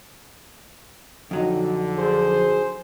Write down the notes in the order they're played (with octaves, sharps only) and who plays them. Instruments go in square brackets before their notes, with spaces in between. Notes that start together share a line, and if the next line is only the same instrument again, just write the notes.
[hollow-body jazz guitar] F2 F#3 D#4 [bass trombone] D3
[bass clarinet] G#4 [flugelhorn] C5